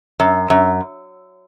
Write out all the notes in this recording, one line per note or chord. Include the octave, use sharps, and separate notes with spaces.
F#2
F#2